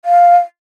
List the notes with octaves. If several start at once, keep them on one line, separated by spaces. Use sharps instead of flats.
F5